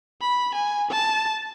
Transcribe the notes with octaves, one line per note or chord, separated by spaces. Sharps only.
B5
G#5
A5